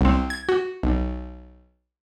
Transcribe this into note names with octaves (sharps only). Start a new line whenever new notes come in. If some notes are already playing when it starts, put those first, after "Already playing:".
C2 C4
G#6
F#4
B1